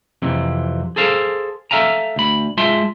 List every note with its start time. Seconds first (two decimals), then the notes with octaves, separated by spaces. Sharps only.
0.22 F2 C3 E3
0.96 G#4 A4 C5 F5
1.71 A4 B4 E5 F5 G#5 A#5
2.16 D2 B5
2.58 G#3 F4 E5 A5 C6